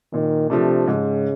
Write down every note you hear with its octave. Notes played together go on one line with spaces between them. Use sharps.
A#2 D#3
C3 F3 A3 D4
G#2 C#3